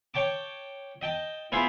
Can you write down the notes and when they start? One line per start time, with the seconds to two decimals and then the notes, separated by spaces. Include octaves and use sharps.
0.14 C#5 G5 A5 D6
1.01 D#5 G5 A5
1.52 B3 E4 F4 G#4 C5